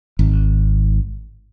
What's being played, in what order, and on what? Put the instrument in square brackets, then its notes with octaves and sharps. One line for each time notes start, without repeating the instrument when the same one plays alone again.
[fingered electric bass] G#1